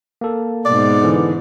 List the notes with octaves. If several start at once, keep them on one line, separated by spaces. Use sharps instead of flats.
A#3 A4
G#2 B2 D5
D3 E3